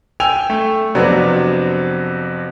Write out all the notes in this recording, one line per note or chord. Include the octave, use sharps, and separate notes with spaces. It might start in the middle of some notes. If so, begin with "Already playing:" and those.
G5 G#5 E6 F7
A3
F2 C3 F#3 B3 D4